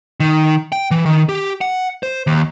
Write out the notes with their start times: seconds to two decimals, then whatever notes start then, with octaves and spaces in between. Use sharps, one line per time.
0.20 D#3
0.72 G5
0.91 E3
1.06 D#3
1.29 G4
1.61 F#5
2.03 C5
2.27 D#2